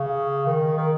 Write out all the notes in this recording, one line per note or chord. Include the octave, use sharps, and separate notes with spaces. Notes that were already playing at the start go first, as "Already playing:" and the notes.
Already playing: C#3
D#3
D#3